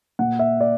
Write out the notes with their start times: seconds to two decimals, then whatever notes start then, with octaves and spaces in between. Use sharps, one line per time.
0.19 A#2 F#5
0.39 E5
0.61 D5